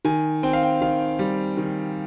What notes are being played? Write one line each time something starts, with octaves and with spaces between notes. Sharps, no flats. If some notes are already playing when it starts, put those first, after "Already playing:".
D#3 G#5
C4 G5
F5
G5
D#3 F5
G3
D#3